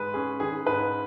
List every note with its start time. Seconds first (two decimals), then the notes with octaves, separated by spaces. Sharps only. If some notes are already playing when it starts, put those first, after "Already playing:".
Already playing: G#2 G#3 B4
0.14 C#4 G#4
0.40 D#3 G#4
0.66 G#2 B4